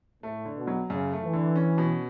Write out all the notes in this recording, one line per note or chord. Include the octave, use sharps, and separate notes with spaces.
A2 A3
D3
B2
F#3
F#2 C#3
A3
E3
D3
C#4
B2